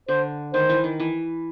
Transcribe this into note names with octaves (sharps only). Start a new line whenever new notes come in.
D3 C5
D#3 C5
E3
D#3
E3